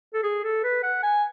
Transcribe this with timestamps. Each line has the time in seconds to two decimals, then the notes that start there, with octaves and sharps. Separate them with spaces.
0.14 A4
0.23 G#4
0.44 A4
0.64 B4
0.83 F#5
1.03 G#5